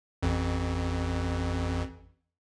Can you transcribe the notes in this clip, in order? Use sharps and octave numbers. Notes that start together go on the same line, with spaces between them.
A1 F2